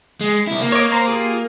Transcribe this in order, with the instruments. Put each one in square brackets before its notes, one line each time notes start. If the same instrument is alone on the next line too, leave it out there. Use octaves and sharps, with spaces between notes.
[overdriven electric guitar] G#3
C2 E4
A#3
[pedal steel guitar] C#5 D#5 D6
C5 A#5
F4 G4 G#4